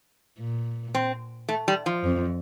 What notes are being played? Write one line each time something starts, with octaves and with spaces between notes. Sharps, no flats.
A#2
C4
A3
G3
F3
F2